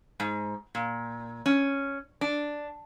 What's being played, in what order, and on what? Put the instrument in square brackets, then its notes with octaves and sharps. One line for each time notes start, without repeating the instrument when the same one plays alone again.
[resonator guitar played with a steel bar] G#2
A#2
C#4
D4